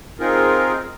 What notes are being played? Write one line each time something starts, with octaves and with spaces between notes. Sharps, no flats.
C4 D#4 F4 G#4 A#4